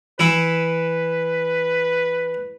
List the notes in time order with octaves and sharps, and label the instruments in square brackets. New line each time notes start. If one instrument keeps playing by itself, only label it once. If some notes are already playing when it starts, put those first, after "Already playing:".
[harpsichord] E3 E4 [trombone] B4